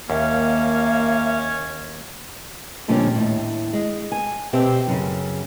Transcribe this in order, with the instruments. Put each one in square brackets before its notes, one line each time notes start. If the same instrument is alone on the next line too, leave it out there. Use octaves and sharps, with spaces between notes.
[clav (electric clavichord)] D#2 [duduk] A#3 [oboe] C#4 [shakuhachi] E5
[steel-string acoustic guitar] F2 A#2 D3 G3 C#4 D4
D#2 A2
G#3
G#5
B2 C4 G4 C5 E5
F#2 C#3